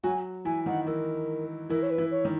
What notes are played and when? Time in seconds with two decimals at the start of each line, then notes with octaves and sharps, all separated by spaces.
0.04 F#3 F#4 G#5
0.45 E3 E4 G#5
0.66 D#3 D#4 F#5
0.86 E3 E4 A#4
1.70 E3 E4 A#4
1.83 C#5
1.90 B4
1.98 E3 E4
2.11 C#5
2.25 D#3